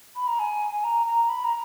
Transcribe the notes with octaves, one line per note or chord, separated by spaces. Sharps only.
B5
A#5
G#5
A#5
A#5
B5
A#5